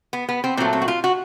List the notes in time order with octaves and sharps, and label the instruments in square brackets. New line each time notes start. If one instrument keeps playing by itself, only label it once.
[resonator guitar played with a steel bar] B3
B3
C4
A#2 F#3 A3 C4
C4
F#4
F4
F#4